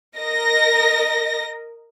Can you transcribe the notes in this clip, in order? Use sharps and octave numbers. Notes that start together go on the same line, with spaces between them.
A#4 D#5 A#6